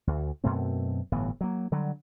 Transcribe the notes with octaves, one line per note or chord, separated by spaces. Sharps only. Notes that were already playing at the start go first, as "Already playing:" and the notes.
D2
F#2 B2 A3 C4
G1 A2 E3 B3
F#3 A#3
D3 F#3 G3